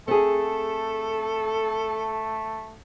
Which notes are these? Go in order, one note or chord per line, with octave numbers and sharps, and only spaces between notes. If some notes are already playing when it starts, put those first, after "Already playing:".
A3 C4 G#4 A4